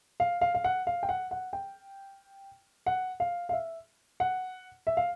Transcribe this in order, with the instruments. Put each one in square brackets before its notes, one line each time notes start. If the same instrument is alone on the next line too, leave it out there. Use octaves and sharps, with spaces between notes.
[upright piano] F5
F5
F5
F#5
F5
G5
F#5
F#5
G5
F#5
F5
F5
E5
F#5
E5
F5